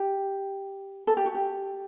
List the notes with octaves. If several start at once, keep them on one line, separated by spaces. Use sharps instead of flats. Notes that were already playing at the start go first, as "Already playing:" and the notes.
Already playing: G4
A4
G4
F#4
G4